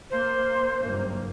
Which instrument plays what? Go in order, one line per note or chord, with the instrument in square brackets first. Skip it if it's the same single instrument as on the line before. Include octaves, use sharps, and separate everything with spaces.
[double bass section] A#3 [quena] C5
[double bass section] F#1 G2 A#3